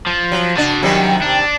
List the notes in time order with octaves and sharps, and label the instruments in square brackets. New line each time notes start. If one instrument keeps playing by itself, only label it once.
[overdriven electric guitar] F3
[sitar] F#3
[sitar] D4 [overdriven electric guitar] F#4 A5
[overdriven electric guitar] F#2 [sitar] C3 D#3 G3
[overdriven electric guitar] D4